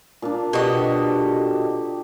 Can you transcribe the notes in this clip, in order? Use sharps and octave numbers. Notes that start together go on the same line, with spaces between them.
A#2 D4
B2 G4 A4 D#5